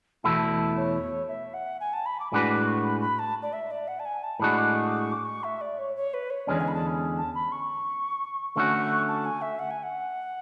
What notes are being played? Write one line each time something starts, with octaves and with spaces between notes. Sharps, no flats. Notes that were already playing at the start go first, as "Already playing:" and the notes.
E2 B2 A3 E4 A5
C#5
E5
F#5
G#5
A5
B5
D6
A2 G#3 D4 F#4 B4 D6
D6
C#6
B5
B5
A5
D5
E5
D5
F#5
A5
G#5
A5
A2 G#3 D4 F#4 B5
D6
C#6
D6
C#6
D6
C#6
E5
D5
C#5
C#5
B4
C#5
E2 D3 G#3 C#4 D5
G#5
B5
A5
A5
B5
C#6
D3 A3 C#4 F#4 C#6
A5
G#5
E5
F#5
G#5
F#5